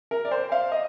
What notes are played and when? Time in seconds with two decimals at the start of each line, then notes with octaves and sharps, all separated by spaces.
0.11 A#4
0.25 D5
0.31 C5
0.52 F5
0.72 D#5